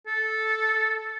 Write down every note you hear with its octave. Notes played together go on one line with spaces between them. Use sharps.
A4